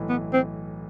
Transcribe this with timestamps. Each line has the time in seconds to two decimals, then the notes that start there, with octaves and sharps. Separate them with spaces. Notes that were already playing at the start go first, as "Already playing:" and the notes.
Already playing: B1 A2 E3
0.09 B3
0.34 C4